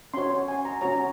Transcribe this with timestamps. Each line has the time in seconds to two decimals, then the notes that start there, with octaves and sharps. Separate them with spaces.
0.14 C#4 F#4 C#5 C6
0.48 G#5
0.65 A#5
0.81 C#4 F#4 C#5 A#5